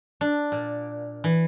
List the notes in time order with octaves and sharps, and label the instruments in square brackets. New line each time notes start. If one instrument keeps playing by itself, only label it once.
[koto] D4
A#2
E3